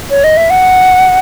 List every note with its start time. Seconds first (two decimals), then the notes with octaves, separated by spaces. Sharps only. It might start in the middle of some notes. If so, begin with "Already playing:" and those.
0.10 C#5
0.24 D#5
0.37 E5
0.50 F#5